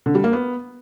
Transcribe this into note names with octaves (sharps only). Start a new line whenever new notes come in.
D3
G3
A#3
B3